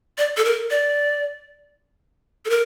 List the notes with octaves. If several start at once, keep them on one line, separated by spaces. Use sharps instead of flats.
D5
A4
A#4
D5
A4
A#4